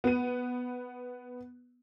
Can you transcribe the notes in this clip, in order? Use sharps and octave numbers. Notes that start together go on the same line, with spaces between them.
B3 D#7